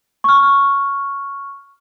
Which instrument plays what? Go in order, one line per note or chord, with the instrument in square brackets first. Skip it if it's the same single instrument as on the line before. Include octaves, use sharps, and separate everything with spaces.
[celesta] C#6 F6